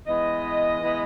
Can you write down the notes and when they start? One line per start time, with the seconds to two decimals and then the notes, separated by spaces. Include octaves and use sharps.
0.06 E3 G#3 B3 D#5
0.82 E3 G#3 B3